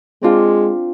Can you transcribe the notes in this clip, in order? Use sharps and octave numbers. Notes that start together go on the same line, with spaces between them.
G#3 C4 D4 F4